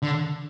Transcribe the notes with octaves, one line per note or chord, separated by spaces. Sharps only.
D3